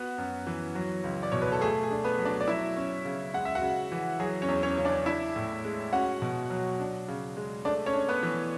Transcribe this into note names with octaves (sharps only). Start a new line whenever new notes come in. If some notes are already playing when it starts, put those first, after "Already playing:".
Already playing: B3 F#4
F#2
E3
F#3
C#2
D5
B2 C#5
B4
A4
A3 G#4
G#4
D4
B3 B4
F#3
D4 D5
D5
F#3 E4 E5
C#4
C#3
G#3 F#5
E5
F#4 F#5
C#3
E3
F#3 G#4
C#4 C#5
E2
C#4 C#5
C#3 C#5
D4 D5
D4 E4 E5
A2
G#3
C#4 F#4 F#5
B2
F#3
D4
C#3
G#3
A3 D4 D5
C#4 C#5
D4
B3 B4
E3